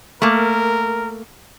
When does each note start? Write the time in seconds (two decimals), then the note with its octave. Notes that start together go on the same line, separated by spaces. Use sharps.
0.22 A3 A#3 A#4